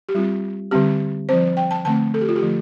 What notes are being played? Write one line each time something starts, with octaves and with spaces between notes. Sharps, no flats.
G4
G3 C4 F4
D3 G3 C4 G4
F3 C4 C5
G5
A5
D3 A3 C4 A5
A4
G4
F4
G4
D3 F3 A3